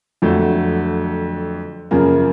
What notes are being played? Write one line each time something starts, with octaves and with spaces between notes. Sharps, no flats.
F2 D3 F#3 A3
F#2 C#3 F3 A#3